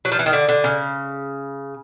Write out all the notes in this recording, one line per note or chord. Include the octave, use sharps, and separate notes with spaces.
F#3
F3
E3
D#3
D3
D3
C#3